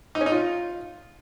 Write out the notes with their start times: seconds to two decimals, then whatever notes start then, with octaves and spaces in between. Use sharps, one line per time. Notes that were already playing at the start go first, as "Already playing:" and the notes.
0.15 D#4
0.21 C#4
0.26 D#4
0.32 F4